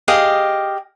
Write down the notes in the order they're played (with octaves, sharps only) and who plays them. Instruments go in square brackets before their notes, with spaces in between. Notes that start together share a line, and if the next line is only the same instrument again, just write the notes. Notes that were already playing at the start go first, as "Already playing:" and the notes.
[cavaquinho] G4 G#4 D#5 F5